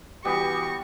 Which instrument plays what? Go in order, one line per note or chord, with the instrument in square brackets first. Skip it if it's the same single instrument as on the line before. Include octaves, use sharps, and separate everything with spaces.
[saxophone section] E3 F#4 G4 [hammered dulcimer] G3 B3 [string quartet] C#6 A#6